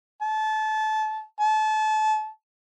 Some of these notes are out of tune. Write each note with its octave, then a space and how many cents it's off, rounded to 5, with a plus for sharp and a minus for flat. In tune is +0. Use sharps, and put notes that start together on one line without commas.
A5 -25
A5 -30